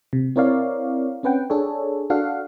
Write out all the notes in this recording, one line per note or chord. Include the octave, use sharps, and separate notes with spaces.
C3
C4 E4 A#4 C#5 D5 F5
C4 C#4 B4 F#5 G5
D4 G#4 A4 C#5
D4 F#4 A4 F5 F#5